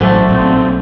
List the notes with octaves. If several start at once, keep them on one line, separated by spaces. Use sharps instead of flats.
A1 D3 F#3 A3 A4 C5
B1 A#2 C4